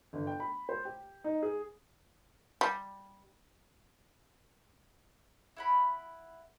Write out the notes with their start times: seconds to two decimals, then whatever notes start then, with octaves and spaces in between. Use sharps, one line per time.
0.13 G1
0.27 G5
0.40 B5
0.69 C5
0.85 G4
1.24 D#4
1.43 G#4
2.61 G3
5.57 E4 F#5 B5